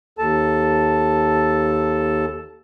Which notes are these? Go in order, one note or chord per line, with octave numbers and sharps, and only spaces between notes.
D#2 A4 A5